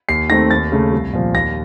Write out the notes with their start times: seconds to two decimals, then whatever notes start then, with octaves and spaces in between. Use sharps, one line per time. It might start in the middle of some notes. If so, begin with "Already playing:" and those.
0.08 D#2 C7
0.30 D#3 A3 C4 A#6
0.51 D#2 A6
0.72 C#3 A3
0.92 C2
1.13 A#2 F3
1.34 D#2 A#6